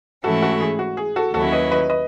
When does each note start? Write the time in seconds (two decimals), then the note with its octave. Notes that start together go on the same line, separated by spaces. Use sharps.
0.24 G#2 E3 A3 C#4 E4 F#4 A4
0.42 F#4 A4
0.52 F#4
0.61 G#4
0.79 F#4
0.97 G#4
1.16 F#4 A4
1.34 D#2 D#3 F#3 C#4 E4 F#4 A4
1.52 B4 D#5
1.71 B4 D#5
1.90 B4 D#5